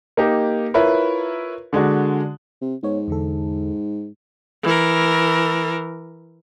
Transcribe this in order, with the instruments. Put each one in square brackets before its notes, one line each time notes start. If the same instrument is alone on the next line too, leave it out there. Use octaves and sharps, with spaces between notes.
[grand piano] A#3 D#4 G4
E4 F4 A#4 B4 C#5
D3 G#3 D4 F#4
[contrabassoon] C3
[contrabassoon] G#2 [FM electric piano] B3 C#5
[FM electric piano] E2 D3 A4
[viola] E3 A#4